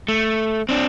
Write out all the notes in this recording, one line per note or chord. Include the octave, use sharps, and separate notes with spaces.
A3
C4 D4